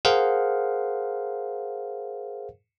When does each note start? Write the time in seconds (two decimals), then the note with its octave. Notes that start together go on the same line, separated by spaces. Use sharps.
0.05 G#4 A#4 C5 F5 F#5